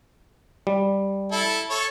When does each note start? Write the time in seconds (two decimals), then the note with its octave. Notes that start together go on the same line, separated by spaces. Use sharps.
0.67 G3
1.32 E4 A4
1.70 A4 C#5